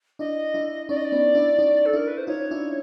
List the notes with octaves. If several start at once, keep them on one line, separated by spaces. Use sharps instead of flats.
D4 E4 D#5
D4 E4
C#4 D#4 D5
D#5
D5
B3 C#4
D4 E4
C#4 D#4
A4
D4 E4 A#4
B4
C5
D#4 F4 C#5
D4 E4